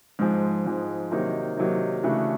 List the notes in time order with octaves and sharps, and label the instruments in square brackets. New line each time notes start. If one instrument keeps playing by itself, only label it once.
[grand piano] G#2 F3 G#3
G#2 F3 G#3
C3 D#3 F#3 A#3 D#4
C3 D#3 F#3 A#3 D#4
C#3 E3 A3 D4 F#4